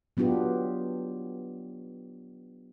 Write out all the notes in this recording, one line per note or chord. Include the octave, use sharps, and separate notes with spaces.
F#3 B3 D4 F4 G4